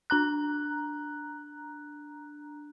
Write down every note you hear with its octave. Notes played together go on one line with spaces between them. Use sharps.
D4 A#5 F#6